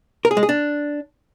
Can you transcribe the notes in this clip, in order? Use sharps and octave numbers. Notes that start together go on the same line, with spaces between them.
A#4
G#4
G#3
G#4
D4